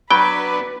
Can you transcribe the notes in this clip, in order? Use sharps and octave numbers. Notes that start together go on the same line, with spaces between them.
F#3 B3 D4 B4 G5 B5